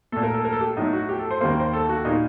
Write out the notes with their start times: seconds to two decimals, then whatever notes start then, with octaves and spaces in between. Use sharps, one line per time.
0.12 A#2 A3 A4
0.23 A#4
0.34 A4
0.45 A#4
0.53 A4
0.61 G4
0.77 A2 F#3 A3 D#4
0.93 F#4
1.09 G4
1.19 A4
1.31 C5
1.41 D#2 D#3 G3 A#3 C5
1.50 A#4
1.60 C5
1.73 A4
1.89 F#4
2.05 A#2 G3 A#3 D#4